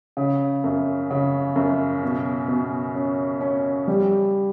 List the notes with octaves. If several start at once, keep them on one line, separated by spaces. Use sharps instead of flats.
C#3
F#2
C#3
F#2
B2
B2
C#4
C#4
G3